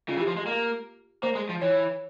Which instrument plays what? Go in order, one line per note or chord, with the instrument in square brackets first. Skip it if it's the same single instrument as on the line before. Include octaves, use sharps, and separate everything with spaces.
[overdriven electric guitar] C#3 [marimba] F4
[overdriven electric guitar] E3
[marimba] G4
[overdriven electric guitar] F3
G#3
A#3
[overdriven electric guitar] A#3 [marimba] C5
[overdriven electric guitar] G#3
F3
[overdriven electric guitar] E3 [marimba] C#5